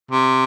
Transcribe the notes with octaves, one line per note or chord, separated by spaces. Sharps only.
C3